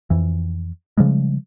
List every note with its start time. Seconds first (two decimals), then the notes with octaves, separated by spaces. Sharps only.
0.10 F2 E3
0.97 C#3 F3 G3 G#3